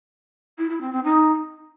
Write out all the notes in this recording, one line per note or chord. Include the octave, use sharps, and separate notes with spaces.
E4
E4
C4
C4
D#4